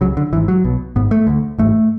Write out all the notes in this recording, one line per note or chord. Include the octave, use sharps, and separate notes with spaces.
C#2 C#3 F#3
D3
G#1 G#2 E3
F#3
B1 B2
G#1 G#2 B3
A3
D2 D3
A1 G#2 A3